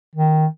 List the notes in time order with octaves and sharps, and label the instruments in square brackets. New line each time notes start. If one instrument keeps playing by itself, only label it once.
[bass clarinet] D#3